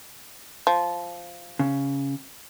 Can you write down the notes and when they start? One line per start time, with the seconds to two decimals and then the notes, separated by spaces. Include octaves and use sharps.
0.67 F3
1.59 C#3